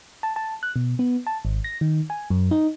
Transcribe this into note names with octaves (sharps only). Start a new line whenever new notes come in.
A5
A5
F#6
B2
B3
A5
G#1
A#6
D#3
G#5
F#2
D#4